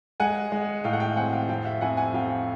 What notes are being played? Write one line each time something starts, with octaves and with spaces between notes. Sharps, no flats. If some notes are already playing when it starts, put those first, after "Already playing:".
G#3 F#5 G#5
G#3
A2 F5 G5
F#5
F5 G5
C4 F#5 G#5
F5 G5
F2 F5 G5
E5 F#5
F2 F#5 G#5
F#5 G#5
F2 F5 G5